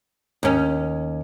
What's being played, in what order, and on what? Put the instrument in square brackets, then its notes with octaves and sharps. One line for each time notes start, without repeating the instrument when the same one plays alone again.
[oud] D#2 C#4